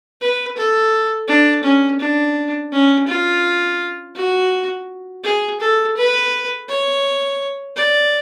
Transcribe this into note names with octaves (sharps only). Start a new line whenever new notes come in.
B4
A4
D4
C#4
D4
C#4
F4
F#4
G#4
A4
B4
C#5
D5